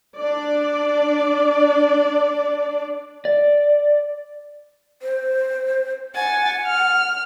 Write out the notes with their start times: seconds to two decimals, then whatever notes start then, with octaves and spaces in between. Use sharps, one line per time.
0.18 D4 D5
3.25 D5
5.02 C5
6.15 F#5 G#5 A6
6.66 F6